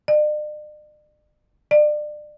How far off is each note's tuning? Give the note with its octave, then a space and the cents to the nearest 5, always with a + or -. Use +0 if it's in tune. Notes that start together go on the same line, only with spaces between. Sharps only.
D5 +45
D5 +30